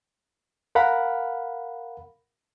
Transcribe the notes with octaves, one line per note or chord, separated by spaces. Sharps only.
A#4 F5 F#5 B5